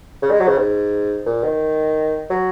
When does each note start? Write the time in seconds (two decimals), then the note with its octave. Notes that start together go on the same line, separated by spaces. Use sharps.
0.22 C#3
0.31 G#3
0.40 F#3
0.48 C#3
0.57 G#2
1.26 A#2
1.43 D#3
2.30 F#3